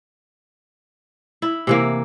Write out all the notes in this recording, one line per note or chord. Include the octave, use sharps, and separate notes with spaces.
E4
C3 E3 A#3